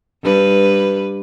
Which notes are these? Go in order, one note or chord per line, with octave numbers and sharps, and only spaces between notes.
G2 B4